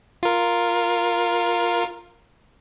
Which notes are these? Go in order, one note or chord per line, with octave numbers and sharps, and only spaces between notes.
F4 A#4